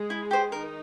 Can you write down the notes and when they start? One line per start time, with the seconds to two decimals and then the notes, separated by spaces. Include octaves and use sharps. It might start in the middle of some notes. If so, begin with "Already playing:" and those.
Already playing: G#3 G#4
0.10 E4
0.31 G4 C5
0.52 D#3 D#4 A#4